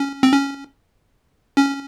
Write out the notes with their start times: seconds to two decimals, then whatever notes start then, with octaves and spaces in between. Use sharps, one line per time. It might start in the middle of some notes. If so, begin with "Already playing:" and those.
Already playing: C#4
0.23 C4
0.32 C#4
1.57 C#4